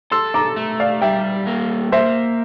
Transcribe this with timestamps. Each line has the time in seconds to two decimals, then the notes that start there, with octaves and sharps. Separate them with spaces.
0.11 A4 C6 E6
0.34 A#5 D6
0.56 A3
0.80 D5 F5
1.02 G3 E5 G5
1.47 A#3
1.92 A#3 C5 E5